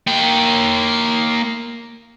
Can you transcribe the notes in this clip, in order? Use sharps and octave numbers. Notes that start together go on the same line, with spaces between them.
A#3 G5